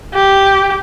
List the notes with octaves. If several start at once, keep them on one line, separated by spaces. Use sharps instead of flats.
G4